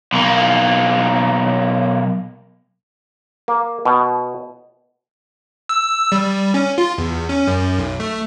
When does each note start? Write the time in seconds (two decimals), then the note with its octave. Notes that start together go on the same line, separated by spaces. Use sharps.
0.13 B1 A#3
3.48 A#3
3.85 B2
5.69 E6
6.12 G3
6.54 C#4
6.78 F4
6.98 E2
7.29 C#4
7.48 F#2
7.78 B1
8.00 A3